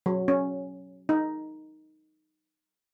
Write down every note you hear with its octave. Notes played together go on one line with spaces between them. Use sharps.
F#3
C#4
D#4